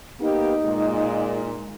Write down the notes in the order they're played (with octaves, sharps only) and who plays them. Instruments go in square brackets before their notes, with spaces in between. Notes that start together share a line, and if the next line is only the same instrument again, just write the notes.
[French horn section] A#3 B3 G4 [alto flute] D#4
[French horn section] A#2 G#3